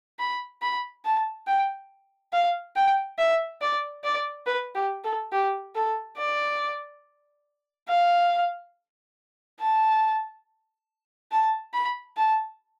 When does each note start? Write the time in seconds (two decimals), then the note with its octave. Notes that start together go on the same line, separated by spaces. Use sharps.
0.19 B5
0.62 B5
1.05 A5
1.48 G5
2.33 F5
2.76 G5
3.19 E5
3.61 D5
4.04 D5
4.47 B4
4.75 G4
5.04 A4
5.32 G4
5.75 A4
6.18 D5
7.89 F5
9.60 A5
11.32 A5
11.74 B5
12.17 A5